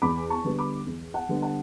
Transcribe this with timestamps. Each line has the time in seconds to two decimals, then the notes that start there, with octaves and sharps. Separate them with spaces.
0.02 E2 B5 D6
0.30 A5 C#6
0.44 D3 G3 B3
0.58 B5 D6
0.86 E2
1.14 F#5 A5
1.29 D3 G3 B3
1.42 F#5 A5